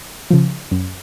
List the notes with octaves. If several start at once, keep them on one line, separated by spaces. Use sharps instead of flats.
C#3 F3
F#2